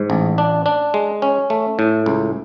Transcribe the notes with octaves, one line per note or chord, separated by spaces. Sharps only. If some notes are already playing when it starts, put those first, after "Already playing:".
Already playing: G#2
A1
D4
D4
G#3
C#4
A3
A2
C#2